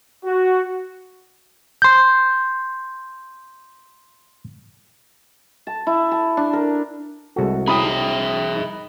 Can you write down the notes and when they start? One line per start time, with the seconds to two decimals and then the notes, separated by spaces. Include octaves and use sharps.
0.25 F#4
1.82 C6 G6
5.67 A5
5.87 E4
6.11 A5
6.37 D4
6.53 A#4
7.36 C2 G#3 F#4 G#4 A4
7.68 C#4 E4 G#4 E5 G5 B5 D#6
7.83 G3 D#4 A#5
8.56 D#4